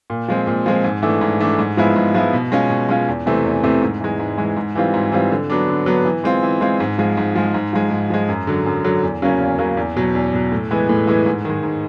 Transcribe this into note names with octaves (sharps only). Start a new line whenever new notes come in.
A#2
F3 G#3 C4
A#2
F3 G#3 C4
G#2
E3 A3 D4
G#2
E3 A3 D4
G#2
F3 G#3 B3 E4
G#2
F3 G#3 B3 E4
B2
G#3 C#4 F4
B2
G#3 C#4 F4
E2
C3 E3 A3 C4
E2
C3 E3 A3 C4
G#2
E3 G#3
G#2
E3 G#3
G#2
E3 G3 C4 F4
G#2
E3 G3 C4 F4
D3
F#3 B3 D4
D3
F#3 B3 D4
E3
G#3 C4 F4
E3
G#3 C4 F4
G#2
F3 G#3
G#2
F3 G#3
G#2
F3 G#3
G#2
F3 G#3
F#2
D3 F#3
F#2
D3 F#3
E2
C#3 F#3 A#3 C#4
E2
C#3 F#3 A#3 C#4
E2
B2 F#3
E2
B2 F#3
A2
E3 G#3 B3
A2
E3 G#3 B3
G#2
D#3 G#3
G#2